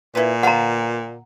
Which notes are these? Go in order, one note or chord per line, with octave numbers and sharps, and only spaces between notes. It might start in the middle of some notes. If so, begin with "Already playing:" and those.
A#2 E4 B4
B3 F5 F#5 A#5